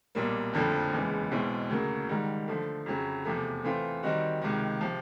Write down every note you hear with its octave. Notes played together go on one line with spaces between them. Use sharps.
B1 A#2 G3 A#3
F#1 F2 D3 F3 A3
F#1 E2 C#3 E3 G#3
B1 B2 G#3 C4 E4
D2 C#3 F#3 A#3
G#2 D#3 G3
D3 F3 A3
F2 C#3 F#3
E2 C3 F3 A3
E3 A3 C4 F4
D#3 G3 C4 D#4 F#4
C#2 C3 D#3
C3 F3